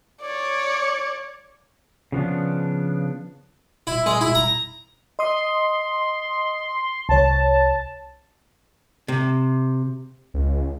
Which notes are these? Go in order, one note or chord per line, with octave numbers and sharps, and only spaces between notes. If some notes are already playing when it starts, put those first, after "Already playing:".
C#5 D5
C#3 F3 B3 D4
E4
G#3
E4
A#5
D#5 C6 D#6
C2 C#5 A5
C3
C#2